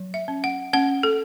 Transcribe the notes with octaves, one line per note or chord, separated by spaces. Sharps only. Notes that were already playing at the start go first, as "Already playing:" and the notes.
Already playing: F#3
E5
C#4
F#5
C#4 F#5
A4